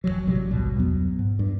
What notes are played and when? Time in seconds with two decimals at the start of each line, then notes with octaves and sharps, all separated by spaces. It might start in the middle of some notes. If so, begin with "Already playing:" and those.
0.04 F1 C#2 E3 F#3
0.27 A1 C3 F#3 G3
0.50 G#1 C#2 B2 G3
0.77 E2 F#3 B3
1.19 G#2
1.39 G2